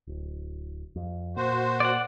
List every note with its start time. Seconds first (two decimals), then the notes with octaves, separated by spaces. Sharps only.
0.07 D1
0.96 F2
1.37 A#2 F#4 C5
1.80 D5 F#5